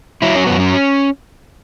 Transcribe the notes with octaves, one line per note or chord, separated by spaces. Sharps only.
F#3 E4
C#4
F#2 B3
C#4